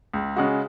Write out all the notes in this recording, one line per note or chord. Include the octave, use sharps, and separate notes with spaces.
C#2
C#3 G#3 F#4